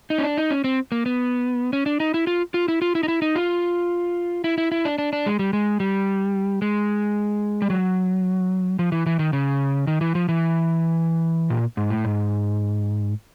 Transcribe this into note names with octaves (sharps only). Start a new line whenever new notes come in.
D#4
C#4
D4
D#4
C#4
C4
A#3
B3
C#4
D4
D#4
E4
F4
F4
E4
F4
E4
D#4
E4
D#4
F4
E4
E4
E4
D4
D4
D4
G#3
G3
G#3
G3
G#3
G3
F#3
F3
E3
E3
D#3
C#3
D#3
E3
F3
E3
A#2
G#2
A2
G#2